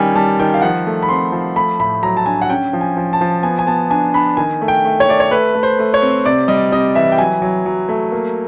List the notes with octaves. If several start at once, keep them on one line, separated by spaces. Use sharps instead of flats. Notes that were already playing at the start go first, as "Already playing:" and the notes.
Already playing: D#3 G3 C#4 G5 G#5
G3 A5
D#3 G5
F5
F3 F#5
A3
B5
C4 C6
F3
A3 B5
A2 B5
F#3 A#5
A5
D4 G#5
F#5
C#4 G5
F3
G#5
F3
A5
F3
B3 G#5
G#5
B3 A5
D4 G#5
D4 B5
D#3 G#5
A3
G5
A3
C#5
A3 D5
C#5
A3 B4
A3
C5
A3
C#5
C4
C3 D5
G3 D#5
C3 D#5
E3 E5
G5
F#3 G#5
F#3
F#3
A3
A#3